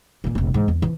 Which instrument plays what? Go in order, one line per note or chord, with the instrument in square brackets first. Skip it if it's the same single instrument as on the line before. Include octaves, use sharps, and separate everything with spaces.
[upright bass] A#2 E3
F1 A#1
G#2 E3
E2
E3 F3